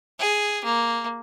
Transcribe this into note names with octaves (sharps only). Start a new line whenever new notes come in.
G#4
A#3